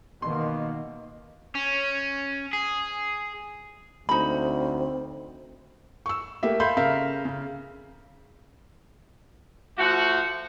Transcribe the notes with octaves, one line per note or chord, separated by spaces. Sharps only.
B2 D#3 A#3 C6
C#4
G#4
D2 C4 D#4 B5
C#6 E6
A3 A#3 G4 E5
A4 E5 F5 B5 C6 G6
C#3 A#4 E5 F5
C#3
F3 A3 F#4